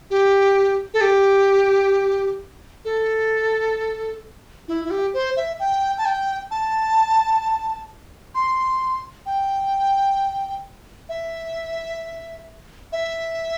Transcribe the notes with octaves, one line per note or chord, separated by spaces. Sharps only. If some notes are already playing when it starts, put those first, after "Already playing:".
G4
A4
G4
A4
E4
E4
G4
C5
E5
G5
A5
G5
A5
C6
G5
E5
E5